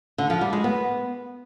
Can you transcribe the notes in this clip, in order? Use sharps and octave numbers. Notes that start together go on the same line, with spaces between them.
D3
F3
G3
G#3
B3